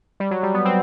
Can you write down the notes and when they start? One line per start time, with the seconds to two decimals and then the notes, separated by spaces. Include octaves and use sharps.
0.20 G3
0.31 F#3
0.43 G3
0.54 B3
0.65 C4